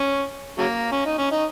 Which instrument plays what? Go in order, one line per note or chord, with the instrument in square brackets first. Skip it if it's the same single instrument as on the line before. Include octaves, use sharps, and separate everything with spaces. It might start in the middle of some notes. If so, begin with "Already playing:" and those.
Already playing: [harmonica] C#4
C#3 F#3 A#3
C#4
D#4
C#4
D#4